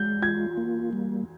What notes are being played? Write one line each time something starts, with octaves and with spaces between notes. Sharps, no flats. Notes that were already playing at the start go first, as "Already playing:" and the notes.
Already playing: G#3 G6
F4 G#6
A#3
G3